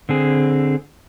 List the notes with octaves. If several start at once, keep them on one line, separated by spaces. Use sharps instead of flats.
D3 C4 G#4